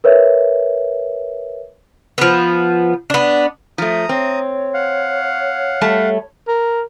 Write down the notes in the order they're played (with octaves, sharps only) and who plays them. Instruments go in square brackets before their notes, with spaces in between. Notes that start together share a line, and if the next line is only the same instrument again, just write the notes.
[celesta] A#4 B4 C#5 E5
[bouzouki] F3 B3
B3 D4
[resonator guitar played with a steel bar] F3 A3 [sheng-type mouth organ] A#5 D#6
[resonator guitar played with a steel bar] C4 [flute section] C#5
[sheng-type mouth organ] F5 F#5
[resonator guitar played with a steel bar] G3 A3 A5
[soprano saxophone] A#4